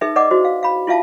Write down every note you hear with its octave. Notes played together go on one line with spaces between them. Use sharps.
D#4 G#4 B4 E5
B4 D5 D#5 F#5 D6
E4 F#4 C5
F5
F5 B5
E4 F4 E5 F5 A5